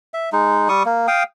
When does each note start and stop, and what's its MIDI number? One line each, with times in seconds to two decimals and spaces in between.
0.14 0.29 76
0.32 0.68 56
0.32 0.68 63
0.69 0.83 55
0.69 0.83 85
0.69 0.83 87
0.86 1.07 58
1.08 1.23 77
1.08 1.23 79
1.08 1.23 87